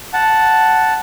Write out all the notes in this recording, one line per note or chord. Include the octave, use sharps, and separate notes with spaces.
F#5 A5